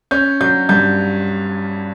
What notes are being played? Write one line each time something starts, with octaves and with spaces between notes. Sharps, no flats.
C#4 G6
F#3 G6
G2 G6